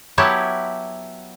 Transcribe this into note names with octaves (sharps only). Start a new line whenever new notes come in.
F#3 B3 E4 G4 C#5 A5